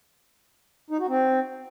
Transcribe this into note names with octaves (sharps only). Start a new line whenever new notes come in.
D#4
F#4
C4